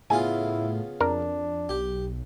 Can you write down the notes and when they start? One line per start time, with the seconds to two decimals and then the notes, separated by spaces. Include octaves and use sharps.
0.10 A2 C#3 B3 E4 F4 G#5
1.01 F2 D4 A#4
1.69 B1 G4